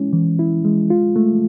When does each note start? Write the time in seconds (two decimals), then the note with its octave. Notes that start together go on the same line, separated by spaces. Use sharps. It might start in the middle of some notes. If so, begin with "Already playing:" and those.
Already playing: G#3 C#4 E4
0.13 E3
0.39 E4
0.65 G#3
0.90 F4
1.16 A3